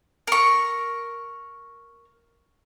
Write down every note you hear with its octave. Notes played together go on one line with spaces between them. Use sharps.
A#4 C#6